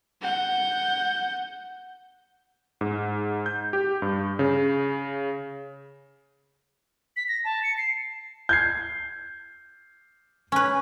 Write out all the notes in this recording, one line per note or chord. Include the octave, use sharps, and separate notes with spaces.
F#5 G6
G#2
G6
G4
G2
C#3
B6
A#6
A5
C#7
C7
G6 G#6 C7
C#4 B4